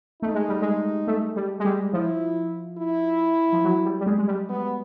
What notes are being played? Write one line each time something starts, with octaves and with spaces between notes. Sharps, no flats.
A3 D#4
G#3
G3
G#3
A3
G3
G#3
G3
F3 E4
E4
F3
F#3
G3
G3
G#3
G#3
G3
B3